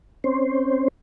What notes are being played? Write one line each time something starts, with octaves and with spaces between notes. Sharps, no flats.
C4 C#4 C5